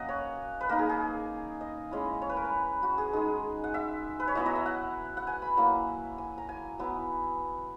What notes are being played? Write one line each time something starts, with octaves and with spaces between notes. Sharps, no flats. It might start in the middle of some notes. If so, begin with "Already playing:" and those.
Already playing: F#3 A#3 C#4 D#5 F#5
C#5
B4
A#3 D#4 A#4
G#4
G#4
D#5
G#3 C#4 E4
C#5
B4
A#4
B4
F#4
G#4
G#3 D#4 G#4
F#5
E5
B4
C#5
F#3 B3 E4 D#5
D#5
E5
F#5
F#5
G#5
B5
F#3 A#3 E4 A#5
G#5
A#5
G#5
F#3 B3 E4